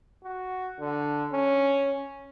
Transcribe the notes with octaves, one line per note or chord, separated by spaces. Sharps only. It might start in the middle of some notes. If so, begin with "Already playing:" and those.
F#4
D3
C#4